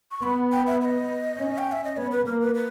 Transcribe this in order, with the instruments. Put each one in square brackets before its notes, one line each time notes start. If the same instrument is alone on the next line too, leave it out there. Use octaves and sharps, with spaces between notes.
[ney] C#6
[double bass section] B3 [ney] B5
[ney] G5
E5
E5
D#5
[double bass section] C#4
[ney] G5
E5
D#5
[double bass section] B3 [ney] C#5
[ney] B4
[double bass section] A#3 [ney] A#4
[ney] B4
B4